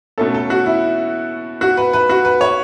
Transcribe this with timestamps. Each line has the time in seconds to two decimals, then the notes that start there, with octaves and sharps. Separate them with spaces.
0.18 B2 A3 C#4 A4
0.34 A4
0.50 F#4
0.66 E4
1.61 F#4
1.77 B4
1.93 B4
2.10 F#4
2.25 B4
2.41 C#5